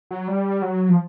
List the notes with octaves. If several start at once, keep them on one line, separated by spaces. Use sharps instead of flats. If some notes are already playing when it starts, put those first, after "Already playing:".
F#3
G3
F#3
F3